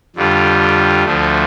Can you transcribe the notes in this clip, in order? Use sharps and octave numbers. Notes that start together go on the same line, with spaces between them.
F2 D3 G3 F4
D2 D3 F3 A3